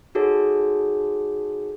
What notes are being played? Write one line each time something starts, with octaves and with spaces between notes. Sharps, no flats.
D#4 F#4 G#4 A4 C#5